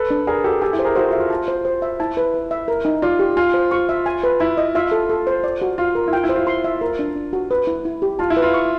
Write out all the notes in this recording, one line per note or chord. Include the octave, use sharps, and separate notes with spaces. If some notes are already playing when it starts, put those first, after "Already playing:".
Already playing: A4 B4
D4
G#4 A#4 D5
F#4 G4 A4
G4 A4 G#5
E4
C5
G#4 A#4
E4 F#4 C5
F4
E5
F4
A5
C5
C5
E5
E4 A5
B4
B4
E5
A#4
D#4
F4 D5
G4
F4 G#5
C5
F4 C#6
E5
G#5
B4
E4 B5
D#5
F4 E5
A4
A4
C5
D5
F#4
F4 F5
A#4
E4
F4 G5
E4
C5
F4
C6
E5
A#4
D4
D4
F#4
B4
E4
E4
G4
F4 A5
E4
B4
F4
C#6